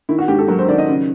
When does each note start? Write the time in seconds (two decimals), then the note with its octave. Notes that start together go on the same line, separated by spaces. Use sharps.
0.09 D#3 E4
0.19 F#4
0.28 G#2 G4
0.38 A4
0.48 F#3 A#4
0.59 C5
0.68 D#3 D5
0.78 D#5
0.89 C#3